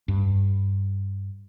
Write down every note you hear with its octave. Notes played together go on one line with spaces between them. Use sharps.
G2